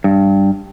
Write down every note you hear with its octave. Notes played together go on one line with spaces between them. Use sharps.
G2